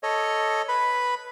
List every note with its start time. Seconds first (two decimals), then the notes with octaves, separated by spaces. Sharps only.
0.03 A4 C#5 D#5
0.69 B4 B5